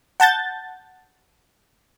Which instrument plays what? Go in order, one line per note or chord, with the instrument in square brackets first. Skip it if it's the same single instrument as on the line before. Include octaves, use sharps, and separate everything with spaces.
[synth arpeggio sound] F#5 A5 G6 A6